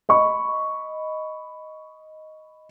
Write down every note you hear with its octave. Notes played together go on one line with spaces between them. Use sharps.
D#5 B5 C#6